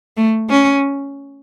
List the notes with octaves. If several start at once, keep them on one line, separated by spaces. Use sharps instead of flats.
A3
C#4